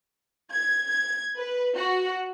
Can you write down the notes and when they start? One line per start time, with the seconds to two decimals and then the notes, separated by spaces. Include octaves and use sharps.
0.51 G#6
0.86 G#6
1.36 B4
1.75 F#4